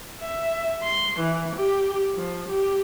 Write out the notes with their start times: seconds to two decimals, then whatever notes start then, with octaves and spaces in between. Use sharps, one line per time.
0.21 E5
0.83 C6
1.19 E3
1.56 G4
2.15 F3
2.49 G4